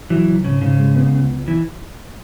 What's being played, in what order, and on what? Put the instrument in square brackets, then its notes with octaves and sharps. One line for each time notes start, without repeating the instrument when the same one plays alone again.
[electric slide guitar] E3 [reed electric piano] F#3
[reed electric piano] C#2
[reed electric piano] G#2 [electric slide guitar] C#3
[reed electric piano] G#2 [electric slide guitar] C#3
[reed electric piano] G#3
B3
C#2
C#2
[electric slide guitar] E3